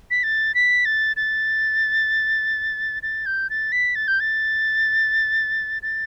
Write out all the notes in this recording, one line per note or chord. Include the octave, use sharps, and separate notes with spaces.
B6
A6
B6
A6
A6
A6
G6
A6
B6
A6
G6
A6
A6